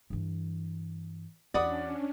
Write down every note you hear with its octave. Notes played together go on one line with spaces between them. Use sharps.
G2 E3
E2 C#4 D4 F#4 D5 B5 D#6